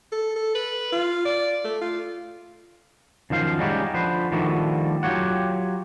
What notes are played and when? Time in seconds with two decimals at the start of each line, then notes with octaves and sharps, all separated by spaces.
0.12 A4
0.36 A4
0.55 B4
0.92 F4
1.25 D5
1.64 A3
1.82 F4
3.30 F#2 D#3 F3 C5 F5
3.59 G3 G#3 C#4 D#4 F#4 G4
3.94 D3 F3 B4 C5
4.32 D3 D#3 F3 G3 A3 F#4
5.03 F#3 F4 G4 C#5 F#5